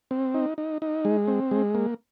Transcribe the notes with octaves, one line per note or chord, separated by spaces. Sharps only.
C4
D#4
D#4
D#4
G#3
C4
G#3
A#3